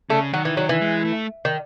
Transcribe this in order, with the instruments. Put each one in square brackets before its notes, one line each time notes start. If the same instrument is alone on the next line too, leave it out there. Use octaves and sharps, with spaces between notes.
[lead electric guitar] C#3 [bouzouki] A3
[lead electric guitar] D#3 [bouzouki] F#3
[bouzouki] E3
F#3
E3
[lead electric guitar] G#3
A3
[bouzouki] D#3